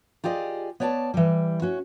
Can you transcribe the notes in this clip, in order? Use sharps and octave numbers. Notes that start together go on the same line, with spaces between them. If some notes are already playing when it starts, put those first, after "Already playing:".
F4 G4 G#4 D5 D#5
B3 C#5 D5 G5 A5
E3 G3
C#4 F#4